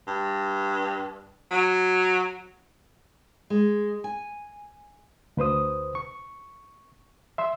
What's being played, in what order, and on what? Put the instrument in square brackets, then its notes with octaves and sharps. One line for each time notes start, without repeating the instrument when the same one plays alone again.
[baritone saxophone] G2
F#3
[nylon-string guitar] G#3
G#5
[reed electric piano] D2 B4 C5 D#6
C#6
E5 C6 E6